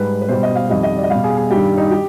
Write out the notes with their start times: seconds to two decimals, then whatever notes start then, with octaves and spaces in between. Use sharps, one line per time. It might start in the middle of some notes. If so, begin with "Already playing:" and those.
Already playing: G#2 G3 B4
0.22 B4
0.28 B2 G3 C5
0.43 D#5
0.55 F5
0.70 F2 D#3 G3 D#5
0.83 D#5
0.96 D5
1.03 D#5
1.10 B2 G3 F5
1.24 G#4
1.37 G#4
1.50 G2 D#3 G3 G4
1.77 D#4
1.91 G4